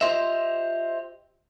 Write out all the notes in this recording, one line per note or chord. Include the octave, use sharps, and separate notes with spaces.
F4 G4 C5 D#5 E5